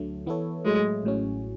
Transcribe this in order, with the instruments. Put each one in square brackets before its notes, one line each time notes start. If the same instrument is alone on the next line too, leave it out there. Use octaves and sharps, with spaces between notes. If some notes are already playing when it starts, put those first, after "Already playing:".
Already playing: [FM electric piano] D2 D3 F#3 A3
E3 B3 E4 A4 C#5
[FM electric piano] A2 F#3 A3 E4 [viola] G#3
[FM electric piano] A1 A2 F#3 C#4